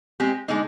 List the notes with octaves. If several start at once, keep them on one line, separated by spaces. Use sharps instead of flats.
G#3 C4 G4
D3 G#3 C4 D#4